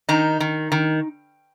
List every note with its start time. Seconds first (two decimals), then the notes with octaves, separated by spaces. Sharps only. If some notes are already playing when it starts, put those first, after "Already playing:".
0.09 D#3 D#4
0.40 D#3
0.72 D#3